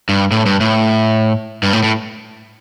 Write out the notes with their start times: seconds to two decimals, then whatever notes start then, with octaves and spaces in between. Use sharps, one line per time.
0.09 G2
0.31 A2
0.46 G2
0.61 A2
1.63 G2
1.73 A2
1.84 A2